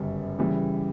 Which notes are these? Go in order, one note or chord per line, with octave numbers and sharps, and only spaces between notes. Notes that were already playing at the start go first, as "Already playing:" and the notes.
Already playing: G1 F#2 C#3 G3
C#3 E3 G3